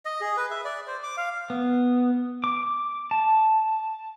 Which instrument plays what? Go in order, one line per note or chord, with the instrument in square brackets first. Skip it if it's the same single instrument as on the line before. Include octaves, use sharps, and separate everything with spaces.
[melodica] D#5
G#4
B4
E5
D5
C5
D6
F5
[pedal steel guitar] B3
D6
A5